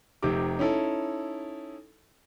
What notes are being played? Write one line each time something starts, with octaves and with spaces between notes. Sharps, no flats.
F1 C3 D#4 G4 D6
C#4 D#4 E4 A4